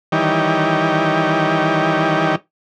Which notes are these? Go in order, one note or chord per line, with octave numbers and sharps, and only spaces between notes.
D#3 E3 G3 D#4 G4 C#5